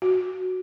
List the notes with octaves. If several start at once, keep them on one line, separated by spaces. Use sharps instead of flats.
F#4